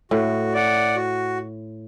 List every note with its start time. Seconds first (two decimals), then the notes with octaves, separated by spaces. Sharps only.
0.11 A2 F#4
0.54 D5 F#5
0.96 F#4